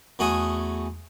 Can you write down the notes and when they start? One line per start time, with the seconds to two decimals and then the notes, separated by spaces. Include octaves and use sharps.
0.19 E2 A3 F#4 G#4 D#6